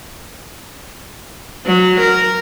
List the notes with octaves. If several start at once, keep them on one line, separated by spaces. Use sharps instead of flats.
F#3
A#4